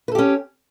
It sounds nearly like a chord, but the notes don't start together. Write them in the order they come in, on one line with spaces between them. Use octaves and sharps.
B4 A4 G4 C#4